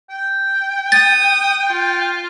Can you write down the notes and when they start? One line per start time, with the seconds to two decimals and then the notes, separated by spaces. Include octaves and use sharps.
0.10 G5
0.92 D#6 A6
1.68 F4